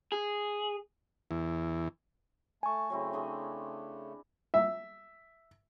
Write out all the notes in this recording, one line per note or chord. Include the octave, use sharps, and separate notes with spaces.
G#4
E2
A3 G#5 A5 C#6
C#3 F#3 A3 C4 E4
D4 G#4 C6
E5